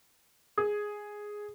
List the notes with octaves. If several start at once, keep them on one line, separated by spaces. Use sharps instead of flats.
G#4